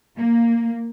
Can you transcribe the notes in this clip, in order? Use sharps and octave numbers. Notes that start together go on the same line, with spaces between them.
A#3